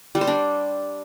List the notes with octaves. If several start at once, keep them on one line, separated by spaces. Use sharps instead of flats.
G3
C5
D4